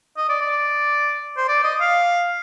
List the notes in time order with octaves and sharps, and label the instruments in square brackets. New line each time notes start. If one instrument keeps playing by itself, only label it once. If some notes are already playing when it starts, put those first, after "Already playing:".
[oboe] D#5
D5
D5
C5
D5
D#5
F5